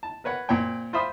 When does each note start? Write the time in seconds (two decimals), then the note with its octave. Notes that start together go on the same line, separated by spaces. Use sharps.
0.03 A5
0.24 A#4 B4 C#5 F#5
0.49 A#2 C4 C#5 G5
0.93 F4 C5 E5 B5 D#6